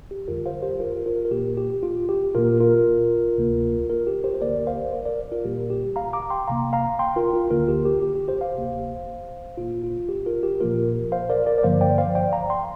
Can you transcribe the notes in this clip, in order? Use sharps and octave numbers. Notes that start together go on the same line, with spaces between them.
G4
F2 D3 G3 F4 A#4
C5 F5
G4 C5
F4 A#4
F4 A#4
A#4
A#2 A#3 G4
G4
F4
G4
A#2 A#3 F4 A#4
F4 A#4
D2 C3 A#3
F4 A#4
G4
G4 C5
C5
D2 D3 A#3 A#4 D5
C5 F5
A#4 D5
A#4 D5
F4 A#4
A#2 G3 A#3 G4
G4
F5 A#5
A#5 D6
G5 C6
C2 C3 A#3 F5 A#5
F5 A#5
G5 C6
F4 A#4
F4
D2 D3 A#3 F4 A#4
G4
G4
G4
G4
G4 C5
C5 F5
D2 C3 A#3
A#2 A#3 F4
F4
G4
F4 A#4
G4
A#2 F3 A#3 F4 A#4
C5 F5
A#4 D5
A#4 D5
D5
G2 D3 F3 A#3 C5 F5
D5 G5
C5 F5
D5 G5
F5 A#5
G5 C6